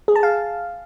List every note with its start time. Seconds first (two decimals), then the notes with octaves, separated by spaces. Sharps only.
0.08 G#4
0.16 A5
0.23 F5